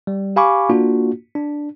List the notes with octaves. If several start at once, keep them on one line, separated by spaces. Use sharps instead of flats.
G3
G4 F5 G#5 B5 C#6 D6
A#3 D4 F4 F#4
D4